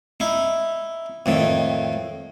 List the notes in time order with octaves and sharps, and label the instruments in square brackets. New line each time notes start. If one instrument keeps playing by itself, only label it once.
[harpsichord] D#4 E4
F2 A2 D#3